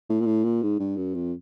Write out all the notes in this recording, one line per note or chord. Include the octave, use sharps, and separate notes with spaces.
A2
A#2
A2
A#2
G#2
G2
F#2
F2